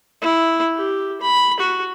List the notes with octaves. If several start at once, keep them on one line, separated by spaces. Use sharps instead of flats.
E4
G4
B5
F#4